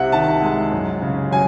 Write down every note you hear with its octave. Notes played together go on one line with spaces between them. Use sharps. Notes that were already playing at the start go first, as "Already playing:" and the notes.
Already playing: C2 C3 E5 F#5
D#3 A5
G#3
F#2
C#3
F#3 G#5